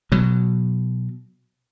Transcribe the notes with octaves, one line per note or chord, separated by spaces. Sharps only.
B2 F#3